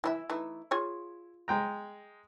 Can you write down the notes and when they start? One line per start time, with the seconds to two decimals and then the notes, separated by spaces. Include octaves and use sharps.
0.04 E3 D#4 E4 E5
0.30 E3 A3 D#4
0.71 F4 G#4 C#5
1.48 G#3 G5 A#5